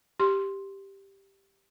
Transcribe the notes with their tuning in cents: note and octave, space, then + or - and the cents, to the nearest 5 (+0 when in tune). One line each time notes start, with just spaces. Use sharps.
G4 +0 C6 +5